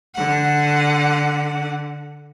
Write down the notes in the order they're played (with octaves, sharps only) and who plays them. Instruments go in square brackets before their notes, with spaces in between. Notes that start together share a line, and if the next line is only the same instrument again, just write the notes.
[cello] D3 F#5